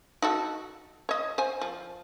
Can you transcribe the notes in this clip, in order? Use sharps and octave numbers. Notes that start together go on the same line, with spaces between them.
D#4 F#4 A4
C#5 D#5
C5 G#5
F3